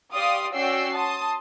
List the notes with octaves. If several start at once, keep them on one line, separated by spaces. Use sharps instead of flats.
G4 D5 F5 C6 D#6
C#4 F#4 D5 G5 E6 C7
A5 C6 D#6